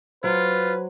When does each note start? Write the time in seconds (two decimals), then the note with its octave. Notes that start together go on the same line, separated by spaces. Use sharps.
0.24 F#3 F4 B4 C5